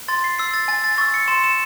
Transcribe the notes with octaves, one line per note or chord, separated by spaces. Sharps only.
C6 A6
C7
E6 C7
A6
G#5 A6
A6
C#6 E6 A6
C#7
C6 E7
E7